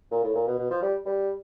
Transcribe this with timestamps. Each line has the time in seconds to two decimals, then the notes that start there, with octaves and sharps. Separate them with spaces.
0.11 A#2
0.23 A2
0.35 A#2
0.47 B2
0.58 B2
0.70 F3
0.82 G3
1.06 G3